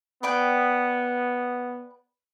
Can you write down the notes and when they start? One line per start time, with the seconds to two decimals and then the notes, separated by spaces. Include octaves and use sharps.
0.23 B3 B4 D5 G5